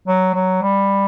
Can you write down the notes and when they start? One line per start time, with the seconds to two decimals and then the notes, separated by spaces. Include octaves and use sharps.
0.08 F#3
0.35 F#3
0.62 G3